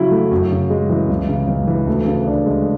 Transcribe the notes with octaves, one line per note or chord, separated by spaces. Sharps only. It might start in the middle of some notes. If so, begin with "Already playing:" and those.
Already playing: C#3 F#3 E4
A3
F#2
C#3
G#3
E3
C#2
C#3
C#2
E3
D2
C#3
D4
G#3